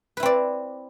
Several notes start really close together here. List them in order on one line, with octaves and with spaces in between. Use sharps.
B4 E4 C4 D5